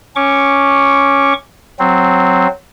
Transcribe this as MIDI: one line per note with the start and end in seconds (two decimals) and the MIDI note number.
0.16 1.34 61
0.16 1.34 85
0.16 1.34 86
1.79 2.47 54
1.79 2.47 60